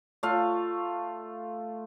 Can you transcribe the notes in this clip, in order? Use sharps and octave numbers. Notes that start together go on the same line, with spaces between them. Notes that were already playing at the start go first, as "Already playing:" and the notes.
A3 F4 F5